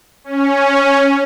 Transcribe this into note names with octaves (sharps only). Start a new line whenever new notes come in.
C#4